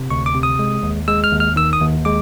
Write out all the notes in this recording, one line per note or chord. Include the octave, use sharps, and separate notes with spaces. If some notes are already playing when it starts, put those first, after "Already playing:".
Already playing: C3
D2 C#6
D6
C3
D#6
G#3
D#2
G#3 E6
F6
D#2
F6
D#3 E6
D#6
D#2
G#3 D6